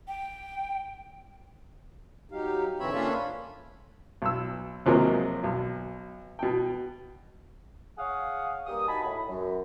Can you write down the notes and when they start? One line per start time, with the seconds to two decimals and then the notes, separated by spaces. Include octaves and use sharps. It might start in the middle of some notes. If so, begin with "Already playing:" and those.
0.08 G5
2.32 F#3 D#4 G4 F5
2.80 G#2 D3 E3 C4 C#5 E5 B5
2.94 A#3 C#4 D4 F4 A4
4.22 B1 E6
4.86 D#2 C3 F3 F#3 G#3 A#3
5.44 B1
6.39 B2 G5
7.98 G#4 C#5 F5 F#5 D#6
8.67 G2 A#3 G4 D#6
8.87 D#4 F#4 G#5 A5 B5
9.03 A2 B5
9.28 F#2